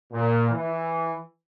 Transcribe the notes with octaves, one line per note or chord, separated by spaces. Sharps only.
A#2
E3